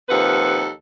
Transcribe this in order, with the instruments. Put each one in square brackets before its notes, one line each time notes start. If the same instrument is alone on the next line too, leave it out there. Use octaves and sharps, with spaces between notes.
[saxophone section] D#2 C3 F3 A4 B4 F#5